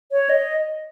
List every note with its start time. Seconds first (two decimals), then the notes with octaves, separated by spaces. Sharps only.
0.11 C#5
0.29 D#5